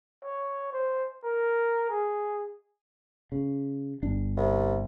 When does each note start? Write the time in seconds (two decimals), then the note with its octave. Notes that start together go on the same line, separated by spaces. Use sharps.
0.23 C#5
0.73 C5
1.24 A#4
1.89 G#4
3.32 C#3
4.03 G1 D4
4.37 C2